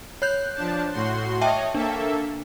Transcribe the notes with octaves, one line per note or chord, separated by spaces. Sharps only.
C#5 F#6 G6
F3 D4 A5
A2 F#4 C6
C#5 D#5 E5 G5 A5
A#3 D4 A4 E5